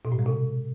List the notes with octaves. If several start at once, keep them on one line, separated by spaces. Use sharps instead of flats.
B2
A2
G#3
C3